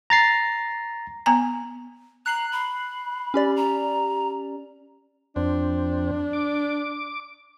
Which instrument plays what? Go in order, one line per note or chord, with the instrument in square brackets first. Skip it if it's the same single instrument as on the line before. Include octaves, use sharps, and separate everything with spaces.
[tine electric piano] A#5 A6 C7
[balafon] B3 G#5 A#5
[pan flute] A#5 [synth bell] F#6 C7 F#7
[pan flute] B5
[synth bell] C#4 G4 D5
[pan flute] A#5
[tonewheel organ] F2 C4 [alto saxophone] D4
[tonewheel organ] D6